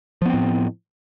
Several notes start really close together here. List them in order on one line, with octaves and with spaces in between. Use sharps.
F3 B3 C4 A2